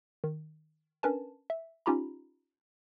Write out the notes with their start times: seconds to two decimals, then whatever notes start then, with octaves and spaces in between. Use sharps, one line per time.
0.24 D#3
1.03 C#4 D4 A#4 B4 G#5 A5
1.50 E5
1.86 C#4 D#4 F4 G4 A#5 B5